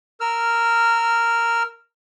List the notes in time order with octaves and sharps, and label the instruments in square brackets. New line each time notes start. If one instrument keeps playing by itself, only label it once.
[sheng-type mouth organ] A#4 E6 F6